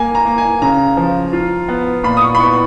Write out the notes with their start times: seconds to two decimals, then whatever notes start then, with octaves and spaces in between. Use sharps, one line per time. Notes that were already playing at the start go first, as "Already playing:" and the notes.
Already playing: A#3 G#5
0.15 A#5
0.25 A#3
0.38 G#5
0.62 C#3 A#5
0.97 F3
1.33 F4
1.68 B3
2.04 A#2 B5
2.17 D#6
2.22 C#6
2.35 B5
2.40 B3 C#6